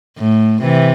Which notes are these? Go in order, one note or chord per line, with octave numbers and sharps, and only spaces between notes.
A2
C3 E3